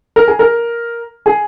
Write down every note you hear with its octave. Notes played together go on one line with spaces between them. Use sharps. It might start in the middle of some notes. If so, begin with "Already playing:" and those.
A#4
G#4
A#4
G#4